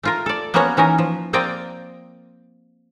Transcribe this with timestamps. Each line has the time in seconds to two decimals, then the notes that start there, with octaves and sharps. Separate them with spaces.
0.03 A3 F4 A#4
0.26 A4 D5
0.54 A#3 B3 C#4 F#4 C#5 F#5
0.77 E3 C#4 D#4 A#4
0.98 F3
1.33 A#3 C4 A#4 D5 D#5 G5